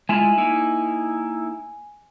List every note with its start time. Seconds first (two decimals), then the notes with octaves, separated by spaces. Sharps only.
0.09 G#3 E4 F4 G#5
0.37 A#3 D#4 E4